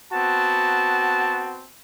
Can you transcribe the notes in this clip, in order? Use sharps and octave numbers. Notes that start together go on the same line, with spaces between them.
B3 C4 F#4 A5